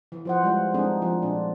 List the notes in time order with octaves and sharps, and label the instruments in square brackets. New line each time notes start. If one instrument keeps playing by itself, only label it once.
[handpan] E3
F3 C5 F#5
G3 G#3 F4
G#3 C4 D4 D#4 G#4
F3
A#2 D4